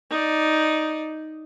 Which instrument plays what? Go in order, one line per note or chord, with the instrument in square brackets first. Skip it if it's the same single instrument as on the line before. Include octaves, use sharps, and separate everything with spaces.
[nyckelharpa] D#4 D5